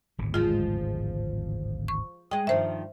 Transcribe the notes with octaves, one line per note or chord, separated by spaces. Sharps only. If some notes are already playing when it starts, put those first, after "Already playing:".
D1 G#1 E2
F3 G#3 F4
C#6
G#3 D#5 G5
G2 D#3 F3 C5 E5